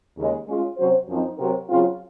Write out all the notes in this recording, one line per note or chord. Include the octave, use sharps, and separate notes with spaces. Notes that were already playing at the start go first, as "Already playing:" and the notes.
D#2 C#3 G#3
G#3 C#4 F4
C3 F#3 C#4 F#4 C5
F#2 F3 C4 D#4
C3 F#3 C4 F#4 A#4
C#3 F#3 C4 F4